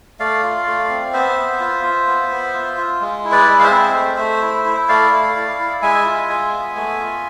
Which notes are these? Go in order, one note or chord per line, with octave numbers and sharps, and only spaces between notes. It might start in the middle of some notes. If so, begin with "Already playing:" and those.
A3 D5 F5
F4
A3
C4
B3 C5 E5
B3
F4
F4
B3
B3
F4
F4
G#3
E4
B4 D5
G#3
F5
C5 E5
C4
A3
A3
E4
E4
A3 D5 F5
A3
E4
E4
G#3 E5 G#5
F4
G#3
B3
A3
F4